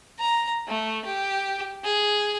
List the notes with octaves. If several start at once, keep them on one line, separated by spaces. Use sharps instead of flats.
A#5
A3
G4
G#4